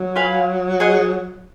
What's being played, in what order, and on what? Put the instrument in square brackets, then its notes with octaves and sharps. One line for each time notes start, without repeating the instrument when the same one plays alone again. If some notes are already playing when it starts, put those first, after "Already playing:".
Already playing: [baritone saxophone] F#3
[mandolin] F4 B4 F5 G#5
G#4 D#5 F#5